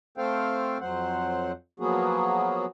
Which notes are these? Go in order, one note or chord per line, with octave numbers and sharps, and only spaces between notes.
A3 C4 A4 C5 F5 G5
F2 F#3 C5 F#5
F3 F#3 A#3 B3 F#4 G#4